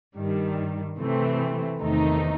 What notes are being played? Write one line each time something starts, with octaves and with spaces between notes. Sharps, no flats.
G2 D#3 G3
C3 E3 A3 C4
E2 C3 D#3 A3 D#4